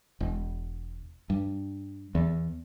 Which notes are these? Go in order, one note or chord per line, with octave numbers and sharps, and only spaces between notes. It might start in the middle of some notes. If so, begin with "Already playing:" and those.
E1
G2
E2